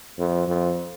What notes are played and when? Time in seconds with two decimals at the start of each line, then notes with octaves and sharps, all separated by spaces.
0.18 F2
0.48 F2